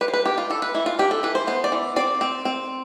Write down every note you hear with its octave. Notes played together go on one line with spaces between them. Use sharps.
G3 B4
C5
B4
D4 G4
F4
E3 A4
B4
E3 E4
F4
D4 G4
A4
E3 B4
C5
B3 C5
D5
E3
C4 D5
C4
C4